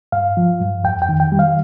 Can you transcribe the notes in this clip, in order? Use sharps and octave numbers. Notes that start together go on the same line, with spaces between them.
G2 F5
F3
G2
F2 G5
G5
D#3
G5
G3
F5